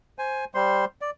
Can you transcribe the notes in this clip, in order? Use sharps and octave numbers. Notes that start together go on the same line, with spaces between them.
C5 G#5
G3 C5 C6
D5